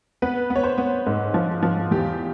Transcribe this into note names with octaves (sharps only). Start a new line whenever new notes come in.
B3 B4
B3
C#5
C5
B3
G#2
F3
F3
E2 G4